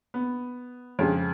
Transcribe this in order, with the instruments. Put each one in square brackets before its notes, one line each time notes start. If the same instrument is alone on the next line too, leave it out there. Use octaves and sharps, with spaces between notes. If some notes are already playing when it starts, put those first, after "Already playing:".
[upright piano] B3
F2 C#3 G#3